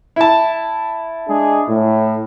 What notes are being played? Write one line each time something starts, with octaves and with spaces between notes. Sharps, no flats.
E4 A5
G#3 D4 G#4
A2